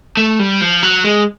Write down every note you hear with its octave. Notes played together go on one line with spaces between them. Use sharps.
A3
G3
F3
F#3
G#3